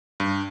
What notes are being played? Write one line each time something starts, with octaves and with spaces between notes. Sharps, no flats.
G2